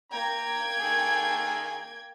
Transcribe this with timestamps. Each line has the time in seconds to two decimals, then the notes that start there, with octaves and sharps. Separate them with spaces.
0.12 A#3 G5 A#5 G#6
0.80 D#3 G#4 A4